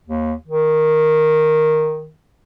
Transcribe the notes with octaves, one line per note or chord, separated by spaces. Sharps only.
D#2
D#3